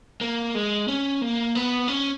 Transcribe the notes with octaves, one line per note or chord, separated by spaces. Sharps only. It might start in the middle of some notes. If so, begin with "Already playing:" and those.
A#3
G#3
C#4
A#3
B3
C#4